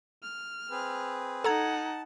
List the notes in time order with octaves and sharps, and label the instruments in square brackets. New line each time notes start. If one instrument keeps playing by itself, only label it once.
[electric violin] F6
[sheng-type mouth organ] C4 G#4 B4
[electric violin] D#4 F#5 [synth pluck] A4 A#5 G#6 [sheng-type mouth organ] A5